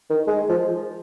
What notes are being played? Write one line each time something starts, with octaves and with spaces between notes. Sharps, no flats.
D#3
G#3
F3